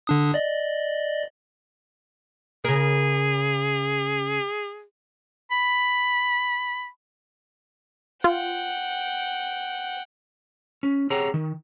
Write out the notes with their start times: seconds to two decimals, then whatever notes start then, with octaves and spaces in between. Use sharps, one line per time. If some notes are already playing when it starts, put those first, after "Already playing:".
0.07 D3 D4 D#6
0.34 D5 D#5
2.65 C#3 G#4 A#4
5.51 B5
8.24 F4 F#5 G5
10.83 C#4
11.10 C4 G4 G#4 C#5 F#5 A#5
11.34 D#3